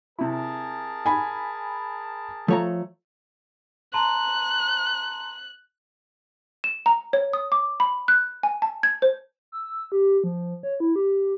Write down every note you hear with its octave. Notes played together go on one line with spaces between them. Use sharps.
C3 E4 G#4 A#4 A5
G#5 B5
F3 A3 C#5 A#5
A5 A#5 C6 F#6
E7
A#5
C#5
D#6
D6
B5
F#6
G#5
A5
G#6
C5
E6
G4
F3
C#5
E4
G4